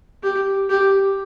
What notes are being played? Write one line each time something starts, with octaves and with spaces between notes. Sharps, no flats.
G4
G4